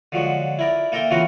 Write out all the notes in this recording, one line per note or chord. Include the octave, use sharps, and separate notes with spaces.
D3 F3 F#3 G#3
E4 A#4 D5
A#3 A4 A#4 E5 G5 C6
C#3 E3 C4 F4 F#4 A#4